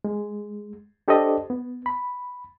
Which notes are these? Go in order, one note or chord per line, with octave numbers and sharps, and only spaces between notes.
G#3
D4 G4 A4 C5 D5 D#5
B3
B5